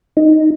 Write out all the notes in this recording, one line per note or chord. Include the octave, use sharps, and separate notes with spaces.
D#4